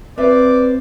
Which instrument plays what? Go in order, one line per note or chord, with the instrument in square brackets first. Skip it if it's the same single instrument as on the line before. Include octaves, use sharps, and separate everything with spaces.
[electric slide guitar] C4 C5 [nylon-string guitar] F4 B4 E5 [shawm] D5